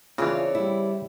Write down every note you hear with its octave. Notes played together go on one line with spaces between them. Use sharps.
C#3 E3 C4 D4 F4 C#5
G3 E4